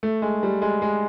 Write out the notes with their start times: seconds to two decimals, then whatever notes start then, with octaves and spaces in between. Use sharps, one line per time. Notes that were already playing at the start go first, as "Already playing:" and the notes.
0.03 A3
0.22 G#3
0.43 G3
0.62 G#3
0.82 G#3